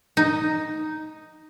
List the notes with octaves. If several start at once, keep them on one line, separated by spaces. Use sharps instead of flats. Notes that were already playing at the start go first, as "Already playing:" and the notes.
D#4